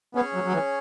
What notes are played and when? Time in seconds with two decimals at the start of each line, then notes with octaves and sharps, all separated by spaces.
0.15 B3 C#4 G#4 C#5
0.34 F#3
0.44 F#3
0.52 E3